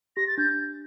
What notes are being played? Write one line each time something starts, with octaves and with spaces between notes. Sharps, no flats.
G4 A#6
A6
D4 G6